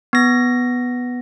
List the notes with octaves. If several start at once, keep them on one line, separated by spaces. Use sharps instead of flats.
B3 A#6